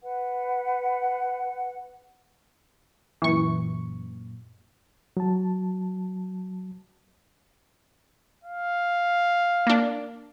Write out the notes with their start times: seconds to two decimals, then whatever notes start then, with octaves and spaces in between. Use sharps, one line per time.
0.02 B4 F#5
3.22 F#2 A#2 E3 C#6
5.17 F#3 A5
8.44 F5
9.67 A#3 D4